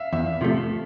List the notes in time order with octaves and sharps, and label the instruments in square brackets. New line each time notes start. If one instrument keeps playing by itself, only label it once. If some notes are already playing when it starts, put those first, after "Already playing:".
Already playing: [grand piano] E5 F5
[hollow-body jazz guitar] E2 [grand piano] E5
[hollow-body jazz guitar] C3 F3 A3